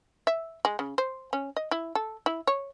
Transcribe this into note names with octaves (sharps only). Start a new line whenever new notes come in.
E5
G#3
C#3
C5
C#4
D#5
E4
A4
E4
C#5